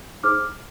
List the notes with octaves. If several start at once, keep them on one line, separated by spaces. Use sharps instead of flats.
D#4 G#4 C5 D6 F6